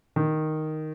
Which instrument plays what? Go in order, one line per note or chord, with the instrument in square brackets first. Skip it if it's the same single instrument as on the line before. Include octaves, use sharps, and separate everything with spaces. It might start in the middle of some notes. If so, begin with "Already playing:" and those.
[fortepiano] D#3